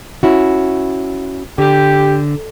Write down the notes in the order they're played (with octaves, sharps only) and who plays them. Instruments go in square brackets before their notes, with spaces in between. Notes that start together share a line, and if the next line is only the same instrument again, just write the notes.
[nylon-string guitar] C#4 E4 F#4
[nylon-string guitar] D3 [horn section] G4